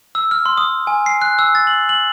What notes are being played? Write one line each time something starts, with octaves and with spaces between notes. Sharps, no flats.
E6
F6
C6
D#6
G#5
C7
F#6
E6
A6
F#7
F#7